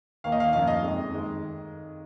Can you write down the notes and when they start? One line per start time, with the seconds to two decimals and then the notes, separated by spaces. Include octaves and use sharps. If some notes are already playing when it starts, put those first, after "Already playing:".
0.24 D#2 D#3 A#3 F5
0.32 D#5
0.40 F5
0.53 F#2 F3 A#3 F5
0.67 D#5
0.82 F2 D#3 G#3
1.12 D#3 G#3